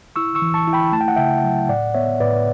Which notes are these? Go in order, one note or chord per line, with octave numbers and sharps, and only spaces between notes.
E4 C#6 E6
C#6 E6
E3
A5 C#6
E4
G5 B5
A3 A5
G5
F#5
C#3 E5 G5
F#3
A2 D5 F#5
B3 C#5 E5
A2 B4 D5